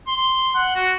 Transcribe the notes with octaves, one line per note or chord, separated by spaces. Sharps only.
C6
F#5
F#4